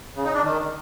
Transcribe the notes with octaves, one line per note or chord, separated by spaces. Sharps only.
C#3
D#4
D4
D#3